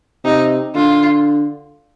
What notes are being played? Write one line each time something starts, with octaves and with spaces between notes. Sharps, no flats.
C3 D#4
D3 F4